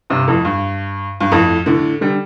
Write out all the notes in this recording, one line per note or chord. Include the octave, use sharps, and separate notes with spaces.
G2 C3
F2 A2
G2
G2
F2 A2
A2 D3
D3 G3